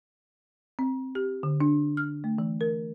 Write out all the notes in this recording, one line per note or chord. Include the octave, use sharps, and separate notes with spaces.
C4
G4
D3
D4
F6
A3
E3
A#4